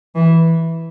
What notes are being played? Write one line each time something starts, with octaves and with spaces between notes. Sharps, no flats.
E3